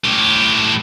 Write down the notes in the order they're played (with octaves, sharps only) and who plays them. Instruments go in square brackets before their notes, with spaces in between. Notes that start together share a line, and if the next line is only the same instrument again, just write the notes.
[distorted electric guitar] A2 G4